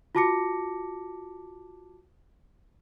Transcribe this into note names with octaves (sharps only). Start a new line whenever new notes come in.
F4 F#4 A5 D6 A#6 C#7